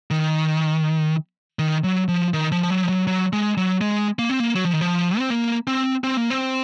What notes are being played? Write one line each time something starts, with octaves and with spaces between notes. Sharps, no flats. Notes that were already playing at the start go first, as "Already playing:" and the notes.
D#3
D#3
F#3
F3
D#3
F3
F3
F#3
F3
F#3
F#3
G#3
F#3
G#3
A#3
C4
A#3
F#3
F3
D#3
F3
C4
A#3
C4
C4
A#3
C4